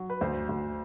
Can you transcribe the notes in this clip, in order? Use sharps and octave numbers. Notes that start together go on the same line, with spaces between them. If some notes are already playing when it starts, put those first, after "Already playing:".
Already playing: F#3
B4
D2 C5
D2